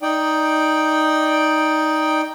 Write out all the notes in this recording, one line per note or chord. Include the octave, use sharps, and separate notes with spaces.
D#4 D5 G5